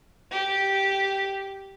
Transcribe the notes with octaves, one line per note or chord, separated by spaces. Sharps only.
G4